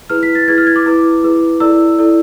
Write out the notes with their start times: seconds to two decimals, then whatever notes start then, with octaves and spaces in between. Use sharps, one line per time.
0.10 E4 G#4 B4 F6
0.23 B6
0.35 A6
0.48 E4 G#4 B4 G#6
0.58 F6
0.67 G#6
0.76 D6
0.86 E4 G#4 B4
1.23 E4 G#4 B4
1.60 E4 A4 D5 E6
1.99 E4 A4 D5